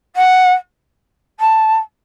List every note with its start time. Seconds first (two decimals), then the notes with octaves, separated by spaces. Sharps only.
0.16 F#5
1.39 A5